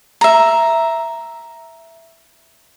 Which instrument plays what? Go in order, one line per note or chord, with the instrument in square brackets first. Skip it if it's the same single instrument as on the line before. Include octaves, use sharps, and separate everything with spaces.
[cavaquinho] E5 A#5